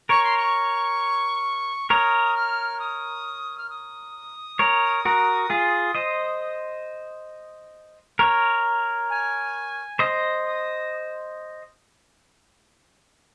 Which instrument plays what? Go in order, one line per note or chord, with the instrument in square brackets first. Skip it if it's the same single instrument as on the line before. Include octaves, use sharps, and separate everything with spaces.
[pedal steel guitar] A#4 C#5 [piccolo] C#6
[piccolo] C6
C#6
[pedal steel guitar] A#4 C#5 [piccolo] D#6
[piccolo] F6
D#6
F6
D#6
[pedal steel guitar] A#4 C#5
F#4 A#4
F4 G#4
C5 D#5
A#4 C#5
[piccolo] G#5
[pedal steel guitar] C5 D#5
[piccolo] D#6